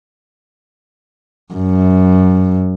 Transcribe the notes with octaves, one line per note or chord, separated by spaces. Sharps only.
F#2